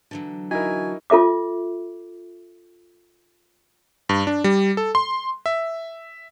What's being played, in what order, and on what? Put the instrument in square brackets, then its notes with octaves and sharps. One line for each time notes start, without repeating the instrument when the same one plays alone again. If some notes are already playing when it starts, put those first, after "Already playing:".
[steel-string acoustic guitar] D3 E3 F#3
[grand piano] D#4 E4 A#4 [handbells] F#4 [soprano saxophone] G#5
[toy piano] F4 A4 E5 D6
[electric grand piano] G2
D4
G3
A4
C6
E5